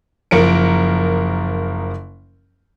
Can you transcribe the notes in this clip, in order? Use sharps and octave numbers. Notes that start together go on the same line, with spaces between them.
F#1 F3 A#4 C#7 D7